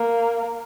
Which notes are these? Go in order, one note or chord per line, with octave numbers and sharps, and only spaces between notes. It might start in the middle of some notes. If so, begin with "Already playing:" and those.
Already playing: A#3